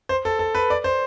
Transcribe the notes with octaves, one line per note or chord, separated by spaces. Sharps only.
C5
A4
A4
B4
D5
C5